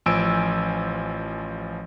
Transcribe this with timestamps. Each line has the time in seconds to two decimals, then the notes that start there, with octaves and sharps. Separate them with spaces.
0.06 A1 F3 G#5 E6 D7